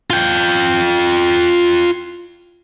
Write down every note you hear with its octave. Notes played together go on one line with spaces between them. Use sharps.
F4 G5